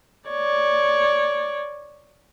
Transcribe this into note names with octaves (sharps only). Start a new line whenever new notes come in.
C#5 D5